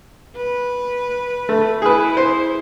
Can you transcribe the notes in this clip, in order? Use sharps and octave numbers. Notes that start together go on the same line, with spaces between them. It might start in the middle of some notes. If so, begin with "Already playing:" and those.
B4
A3
E4 G#4 B4
C5